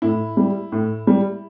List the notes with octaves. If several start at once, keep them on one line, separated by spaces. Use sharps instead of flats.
A2 E4
G3
A2
G3